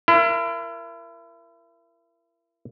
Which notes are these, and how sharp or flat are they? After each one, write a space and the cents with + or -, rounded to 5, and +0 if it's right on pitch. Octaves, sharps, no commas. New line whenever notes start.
E4 +35 A#4 +0